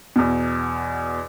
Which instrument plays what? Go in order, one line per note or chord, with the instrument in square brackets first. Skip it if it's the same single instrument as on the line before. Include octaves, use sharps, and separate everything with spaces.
[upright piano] E2 B2